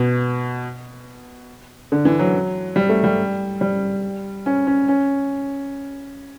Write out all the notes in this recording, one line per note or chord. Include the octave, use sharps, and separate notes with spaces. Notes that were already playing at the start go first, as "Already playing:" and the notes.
Already playing: B2
D3
E3
F#3
G3
A3
G3
G3
C#4
C#4
C#4